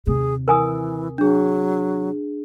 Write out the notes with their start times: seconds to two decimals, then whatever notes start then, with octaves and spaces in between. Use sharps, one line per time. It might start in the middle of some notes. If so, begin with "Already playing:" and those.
0.07 D#2 C3 G#4
0.48 E3 A#4 G#5 D#6
1.18 F#3 D4 G#4